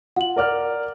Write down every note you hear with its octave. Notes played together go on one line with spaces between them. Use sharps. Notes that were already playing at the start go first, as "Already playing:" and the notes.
F4 F#5 F#7
A#4 D5 F6